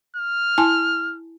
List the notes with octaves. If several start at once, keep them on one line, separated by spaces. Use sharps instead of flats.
F6
E4 G#5 A5